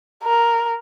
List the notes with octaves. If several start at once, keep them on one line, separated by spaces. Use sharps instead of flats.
A#4